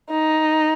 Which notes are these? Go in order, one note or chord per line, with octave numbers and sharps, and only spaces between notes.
D#4